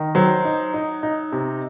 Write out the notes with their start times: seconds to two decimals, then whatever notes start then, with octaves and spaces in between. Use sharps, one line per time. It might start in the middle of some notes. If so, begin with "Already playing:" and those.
Already playing: D#3
0.15 F#3 C5
0.45 D#4
0.74 D#4
1.03 D#4
1.32 C3